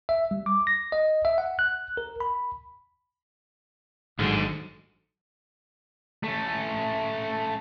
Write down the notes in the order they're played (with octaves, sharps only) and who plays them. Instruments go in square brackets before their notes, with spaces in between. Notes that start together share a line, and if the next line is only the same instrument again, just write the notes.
[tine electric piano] E5
G3
D6
A#6
D#5
E5
F#5
F#6
A#4
B5
[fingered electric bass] A1 D#3 F#3 [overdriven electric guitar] D#2 D3 [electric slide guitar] G#2
[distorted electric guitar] A3 C#4